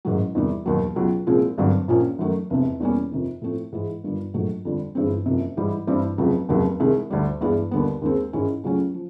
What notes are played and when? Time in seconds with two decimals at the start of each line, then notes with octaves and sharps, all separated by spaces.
0.05 A1 G#2 D#3 F#3
0.35 E2 C3 D#3 G3
0.66 E1 D#2 D#3 F#3
0.96 C#2 B2 F#3
1.27 C2 A#2 F3 G#3 C4
1.58 G#1 G2 D3 F#3
1.88 A#1 A#2 F3 A#3 C#4
2.19 F#2 D#3 F#3 A3
2.50 F1 E2 C3
2.80 E2 B2 G3 A#3 C#4
3.12 F2 C3 D#3
3.41 A2 F3 A3 C4
3.72 G#2 E3 G#3
4.04 G1 G2 D#3 G3
4.34 A#1 G#2 D#3 F#3 A3
4.65 F2 D3 G3
4.95 G1 G2 E3 G#3 C4
5.26 F#1 F2 C3
5.57 G#2 E3 G3
5.87 G2 E3 G3 C4
6.18 F1 F2 C#3 F#3
6.49 F1 D#2 C#3 F#3
6.80 C2 C3 D#3 G#3
7.10 D2 D3 G3
7.41 G2 E3 G#3 B3 D4
7.71 D#2 D3 G3 B3
8.02 D#2 D#3 G#3 C4
8.33 G#2 D#3 G#3 C#4 E4
8.64 C#2 C#3 F#3 A3 C#4
8.94 F3